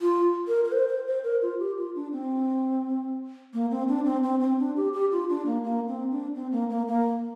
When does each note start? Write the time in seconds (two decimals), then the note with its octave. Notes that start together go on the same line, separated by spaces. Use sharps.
0.01 F4
0.48 A#4
0.65 A#4
0.72 C5
0.89 C5
1.07 C5
1.24 A#4
1.42 F4
1.59 G4
1.78 F4
1.95 D4
2.13 C4
3.54 A#3
3.71 C4
3.88 D4
4.05 C4
4.23 C4
4.40 C4
4.59 D4
4.76 G4
4.93 G4
5.12 F4
5.30 D4
5.46 A#3
5.64 A#3
5.88 C4
6.11 D4
6.35 C4
6.52 A#3
6.70 A#3
6.88 A#3